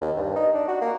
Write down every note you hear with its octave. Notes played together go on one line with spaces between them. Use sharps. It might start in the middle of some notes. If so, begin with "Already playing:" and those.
D#2
G2
D#4
D4
F#4
A#3